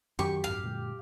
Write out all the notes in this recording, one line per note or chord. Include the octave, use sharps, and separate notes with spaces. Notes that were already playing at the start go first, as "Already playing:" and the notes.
F#2 D#3 G4 C#6
A#1 E2 G#2 F5
A#2 D3 G#3